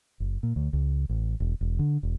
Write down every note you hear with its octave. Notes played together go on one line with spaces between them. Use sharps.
F#1
A#2
D2
C#2
A1
E1
E1
D3
E1